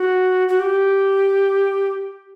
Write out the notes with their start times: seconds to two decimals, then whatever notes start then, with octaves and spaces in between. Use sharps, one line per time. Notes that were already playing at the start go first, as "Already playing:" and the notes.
Already playing: F#4
0.49 F#4
0.60 G4